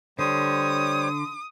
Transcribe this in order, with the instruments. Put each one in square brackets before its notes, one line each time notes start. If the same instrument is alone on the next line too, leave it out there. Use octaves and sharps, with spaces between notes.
[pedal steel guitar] D3 [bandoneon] G3 C5 C#5 [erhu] D#6